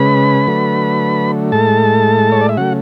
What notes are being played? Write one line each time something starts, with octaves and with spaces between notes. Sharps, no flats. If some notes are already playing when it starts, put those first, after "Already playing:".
Already playing: C#3 G#3 B4 B5
D3 F#3 A3
A2 G#3 A4 A5
C#5
D5
E5
C#3 F#3 A3 F#4 F#5